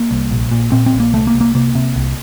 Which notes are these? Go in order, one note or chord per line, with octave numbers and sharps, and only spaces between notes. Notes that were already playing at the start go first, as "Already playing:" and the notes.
Already playing: A#3
C2
A#1
A#2
A#2 C4
C4
A#1
A#3
C2 A3
A#3
C2
A#3
C3 A#3
C3
C2